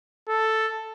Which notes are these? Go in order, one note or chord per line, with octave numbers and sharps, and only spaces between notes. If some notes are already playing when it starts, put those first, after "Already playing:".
A4